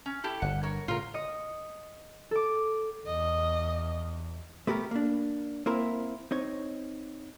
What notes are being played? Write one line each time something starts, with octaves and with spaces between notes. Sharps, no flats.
C#4
E4 G4 A4
G1 D3 F#5
A#4 C#5
A2 C#3 F4 A#4
D#5 D#6 C#7
A4 D6
E2 D#5
A3 B3 G4 A4 A#4
A#3 D4
A#3 C4 E4 A#4
C4 D#4 C#5